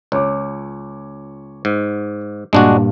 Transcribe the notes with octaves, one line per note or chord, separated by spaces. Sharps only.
C#2 C#5 D6
G#2
G2 A#2 G#3 D4 F#4